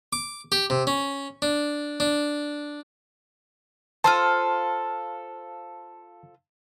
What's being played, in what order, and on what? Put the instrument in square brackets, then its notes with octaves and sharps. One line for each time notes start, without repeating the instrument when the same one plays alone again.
[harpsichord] D6
G4
C3
C#4
D4
D4
[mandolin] F4 A4 C5 [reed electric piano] A5